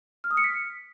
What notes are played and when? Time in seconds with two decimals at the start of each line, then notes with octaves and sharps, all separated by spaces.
0.24 F6
0.31 D#6
0.37 C#7
0.44 B6